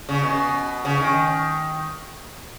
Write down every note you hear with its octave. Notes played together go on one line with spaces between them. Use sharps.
C#3
B2
C#3
D#3